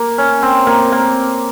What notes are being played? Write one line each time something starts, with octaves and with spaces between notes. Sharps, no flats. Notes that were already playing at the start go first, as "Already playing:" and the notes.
Already playing: A#3
C#4
C4
A#3
A#3